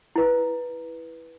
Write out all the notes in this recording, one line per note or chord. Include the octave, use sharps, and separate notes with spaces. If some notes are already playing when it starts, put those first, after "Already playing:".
E4 B4